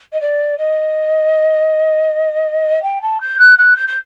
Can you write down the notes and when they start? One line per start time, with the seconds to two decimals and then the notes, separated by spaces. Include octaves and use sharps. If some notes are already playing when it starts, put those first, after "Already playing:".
0.12 D#5
0.21 D5
0.58 D#5
2.82 G5
3.02 A5
3.20 G6
3.39 F#6
3.58 F#6
3.76 G6
3.87 G6